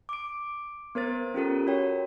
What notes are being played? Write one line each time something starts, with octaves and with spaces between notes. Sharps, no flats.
D6 D7
B3 A#4 C5 A6
C#4 F4 G4 A4 A#4
F#4 A#4 C#5 G5